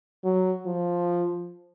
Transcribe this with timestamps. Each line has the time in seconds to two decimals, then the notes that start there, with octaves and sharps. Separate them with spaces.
0.24 F#3
0.66 F3